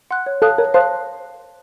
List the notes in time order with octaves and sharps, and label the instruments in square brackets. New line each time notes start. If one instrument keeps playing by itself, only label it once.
[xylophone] F#5 C6 F#6
C#5
[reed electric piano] A4 [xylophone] F5 A5 D#6 F#6
[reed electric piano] A#4 [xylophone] C#5
[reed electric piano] C5 [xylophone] F5 A5 D#6 F#6